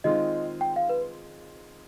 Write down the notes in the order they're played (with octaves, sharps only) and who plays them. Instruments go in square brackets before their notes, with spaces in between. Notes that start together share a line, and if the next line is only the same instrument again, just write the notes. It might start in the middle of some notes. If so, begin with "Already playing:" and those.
[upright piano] D#3 G#3 C4 F4 [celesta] D#5
[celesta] G5
F5
B4